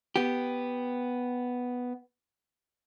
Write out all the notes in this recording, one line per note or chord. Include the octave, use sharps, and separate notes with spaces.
B3 G4